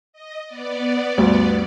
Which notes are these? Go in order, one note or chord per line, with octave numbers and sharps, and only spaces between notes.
D#5
B3 D5
D2 G2